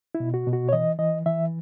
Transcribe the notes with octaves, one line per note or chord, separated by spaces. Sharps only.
E4
B2
F#4
B2
F#4
C#5
E3 D#5
E3 D#5
E3 E5